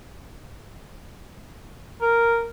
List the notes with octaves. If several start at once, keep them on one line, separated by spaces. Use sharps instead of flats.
A#4